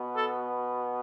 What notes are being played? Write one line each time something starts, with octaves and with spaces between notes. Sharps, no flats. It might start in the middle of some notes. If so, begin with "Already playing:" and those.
Already playing: B2 B3
A4